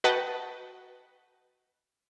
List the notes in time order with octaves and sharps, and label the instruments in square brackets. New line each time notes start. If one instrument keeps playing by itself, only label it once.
[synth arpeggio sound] F#4 B4 D#5 F#5 G5 A5